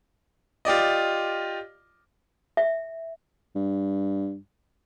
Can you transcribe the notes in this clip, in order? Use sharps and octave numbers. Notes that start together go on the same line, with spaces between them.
F4 G4 D5 D#5
E5
G2